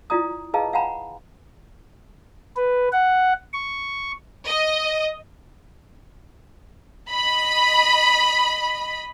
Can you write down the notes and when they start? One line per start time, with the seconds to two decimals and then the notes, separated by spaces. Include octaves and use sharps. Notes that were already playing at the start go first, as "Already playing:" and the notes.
0.10 E4 F4 D5 A#5 D#6
0.54 G#4 B4 D#5 F5 A5 A#5
0.73 F5 F#5 G#5 A#5 B5
2.56 B4
2.92 F#5
3.53 C#6
4.47 D#5
7.11 D#5 B5